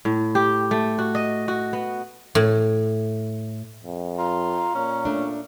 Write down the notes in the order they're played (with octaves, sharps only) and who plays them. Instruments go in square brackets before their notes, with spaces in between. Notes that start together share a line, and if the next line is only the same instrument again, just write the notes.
[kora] A2
G4
A3
F#4
D#5
F#4
B3
[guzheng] A2
[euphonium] F2
[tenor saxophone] F4 [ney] A#5
[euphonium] A#2 [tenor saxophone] C#4
[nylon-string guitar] A3 D4